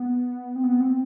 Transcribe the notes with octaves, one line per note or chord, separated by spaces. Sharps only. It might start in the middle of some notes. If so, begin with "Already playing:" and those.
Already playing: B3
C4
B3
C4